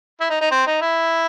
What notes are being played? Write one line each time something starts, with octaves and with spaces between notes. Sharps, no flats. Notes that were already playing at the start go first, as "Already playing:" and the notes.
E4
D#4
D#4
C4
D#4
E4